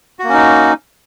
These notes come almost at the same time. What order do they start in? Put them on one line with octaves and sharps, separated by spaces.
F#4 A#3 C#4 D#4